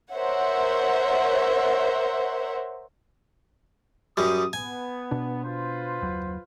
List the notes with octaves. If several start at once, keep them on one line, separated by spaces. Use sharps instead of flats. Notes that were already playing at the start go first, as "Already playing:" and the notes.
A#4 C5 C#5 E5 F#5
F#2 G3 D#6
B3 G#5
B2 D4
F4 B4 C5
F#1 D#2 F#3